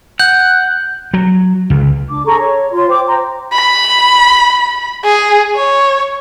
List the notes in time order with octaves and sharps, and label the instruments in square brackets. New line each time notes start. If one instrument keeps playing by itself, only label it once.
[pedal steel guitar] F#5 [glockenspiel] G6
[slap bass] F#3
C#2
[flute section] D4 D6
G#4 A4 A#5 C#6
C#5
F4 C#5 C6
C5 G5 D6
C5 G5 A#5 C6
[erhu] B5
G#4
C#5